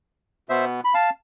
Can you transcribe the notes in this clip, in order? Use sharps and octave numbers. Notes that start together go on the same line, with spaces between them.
B2 B3 C5 E5
B5
F5 A5